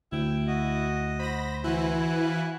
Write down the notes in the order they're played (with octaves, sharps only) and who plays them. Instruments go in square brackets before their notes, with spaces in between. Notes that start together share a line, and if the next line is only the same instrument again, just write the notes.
[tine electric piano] D2 [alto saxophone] E4 [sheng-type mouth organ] G5
[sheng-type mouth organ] F#4 D#5
[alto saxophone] C5 [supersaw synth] B5 A#6
[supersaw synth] E3 E4 [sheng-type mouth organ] F#4 G#5 F#6
[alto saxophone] F5